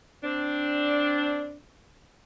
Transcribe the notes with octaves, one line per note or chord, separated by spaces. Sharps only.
C4 D4